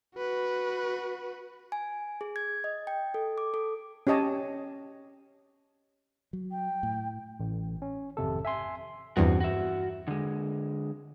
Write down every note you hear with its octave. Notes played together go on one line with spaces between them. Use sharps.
F#4 B4
G#5
G#4
G#6
D#5
G5
A4
D6
A4
C#4 G4 C#5 D#5 A5
F#3
G5
A2
A1
C#4
G#1 F2 C3 A4
E5 G#5 C6
E2 G2 C4 F#4
F#4 E5
D3 G#3